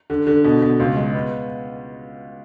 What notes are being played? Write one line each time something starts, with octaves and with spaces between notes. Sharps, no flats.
D3
D3
B2
B2
C#2
G#3
B3